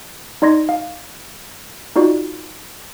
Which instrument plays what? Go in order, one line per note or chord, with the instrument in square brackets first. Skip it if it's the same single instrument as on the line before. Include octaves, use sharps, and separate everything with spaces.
[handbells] D#4 D5 C6 G#6 A#6
F5
D#4 F4 F#4 D5